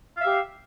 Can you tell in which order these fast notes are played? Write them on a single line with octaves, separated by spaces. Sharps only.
F5 E5 G4